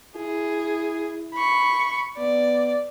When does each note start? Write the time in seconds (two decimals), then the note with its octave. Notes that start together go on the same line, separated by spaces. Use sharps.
0.16 E4 G#4
1.35 B5 C#6
2.18 B3 D5